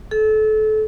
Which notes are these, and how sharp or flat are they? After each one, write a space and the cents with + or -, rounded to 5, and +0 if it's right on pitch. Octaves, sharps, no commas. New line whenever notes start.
A4 -30